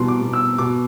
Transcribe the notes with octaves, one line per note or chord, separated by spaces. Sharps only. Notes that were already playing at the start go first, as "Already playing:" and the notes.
Already playing: E2 B2 G3 C6
D6
B2
E6
B2 D6